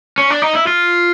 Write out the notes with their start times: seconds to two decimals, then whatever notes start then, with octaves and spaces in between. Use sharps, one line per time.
0.18 C#4
0.30 D4
0.42 D#4
0.55 E4
0.67 F4